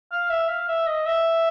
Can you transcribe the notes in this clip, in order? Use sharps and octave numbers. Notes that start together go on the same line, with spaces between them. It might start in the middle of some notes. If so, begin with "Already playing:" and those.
F5
E5
F5
E5
D#5
E5